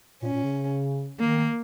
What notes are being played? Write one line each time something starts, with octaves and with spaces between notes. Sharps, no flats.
A#2 C#4
A#2
C#3
D#3 A#3